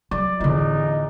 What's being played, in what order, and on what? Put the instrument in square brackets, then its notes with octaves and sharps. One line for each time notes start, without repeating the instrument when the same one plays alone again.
[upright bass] F#3 [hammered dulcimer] D5
[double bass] A1 E2 [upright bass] D3 F4 [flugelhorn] D#4